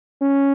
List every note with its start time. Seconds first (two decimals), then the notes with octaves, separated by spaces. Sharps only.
0.22 C#4